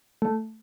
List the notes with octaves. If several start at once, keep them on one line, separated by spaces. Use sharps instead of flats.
A3